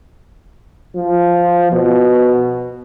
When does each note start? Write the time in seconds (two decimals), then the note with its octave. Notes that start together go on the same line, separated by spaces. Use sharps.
0.96 F3
1.72 B2